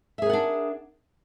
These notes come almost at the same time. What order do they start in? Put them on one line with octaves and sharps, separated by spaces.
E5 G#4 A#4 F#5 D4